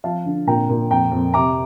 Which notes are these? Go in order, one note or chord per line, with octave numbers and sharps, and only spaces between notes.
F3 F5 A5
D3
A#2 G5 A#5
A#2
F2 G5 A#5
F2
C3 A#5 D6